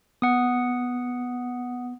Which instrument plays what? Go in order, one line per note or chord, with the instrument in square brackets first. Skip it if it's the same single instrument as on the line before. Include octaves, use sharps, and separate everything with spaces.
[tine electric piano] B3 [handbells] F#5 D#6